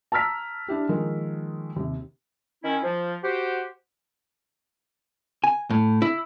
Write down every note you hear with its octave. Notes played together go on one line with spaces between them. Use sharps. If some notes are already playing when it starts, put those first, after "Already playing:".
A5 A#5 E6 F6 B6
D4 E4 G4
D#3 F3 G#3 A#3
D#2 C3
D#3 C#4 E4
F3
F#4 G4 C5
G#5
A2
E4